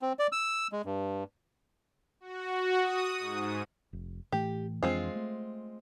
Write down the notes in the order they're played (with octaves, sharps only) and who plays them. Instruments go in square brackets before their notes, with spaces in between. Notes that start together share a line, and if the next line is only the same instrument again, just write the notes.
[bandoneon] C4
D5
E6
G#3
G2
[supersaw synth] F#4
D#6
G#2
[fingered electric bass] F1
[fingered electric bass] A2 E3 A3 [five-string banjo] G4
[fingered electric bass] F2 E3 D4 [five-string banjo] G#3 C4 F4
[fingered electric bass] A3